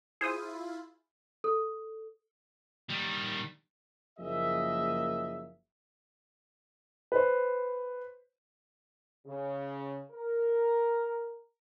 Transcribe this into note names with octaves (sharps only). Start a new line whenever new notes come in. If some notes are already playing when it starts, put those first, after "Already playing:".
E4 F4 G#4 C5 D#6
A4
D#3 G3
F#1 F3 A#3 G#4 D#5 E5
B4 C5
C#3
A#4